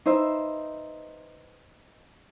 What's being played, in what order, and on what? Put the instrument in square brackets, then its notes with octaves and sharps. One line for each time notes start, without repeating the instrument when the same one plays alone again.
[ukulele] D#4 B4 C5 E5